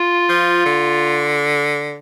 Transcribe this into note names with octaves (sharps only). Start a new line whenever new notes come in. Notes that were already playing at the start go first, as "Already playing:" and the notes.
Already playing: F4
F3
D3